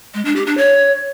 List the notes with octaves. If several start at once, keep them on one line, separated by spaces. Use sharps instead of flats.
G#3
D4
G4
D4
C#5